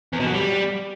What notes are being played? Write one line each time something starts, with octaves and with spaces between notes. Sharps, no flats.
E2
B2
F#3
G3